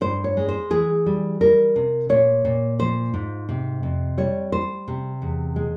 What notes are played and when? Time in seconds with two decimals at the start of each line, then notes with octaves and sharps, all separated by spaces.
0.01 G2 C5
0.24 C#5
0.37 G#3
0.49 C5
0.70 E3 G#4
1.06 G3
1.41 G3 A#4
1.76 C3
2.09 A#2 C#5
2.45 A#2
2.79 F3 C5
3.14 G#2
3.49 C3
3.83 F2
4.18 G3 C#5
4.52 G3 C5
4.88 C3
5.22 E2
5.56 G#3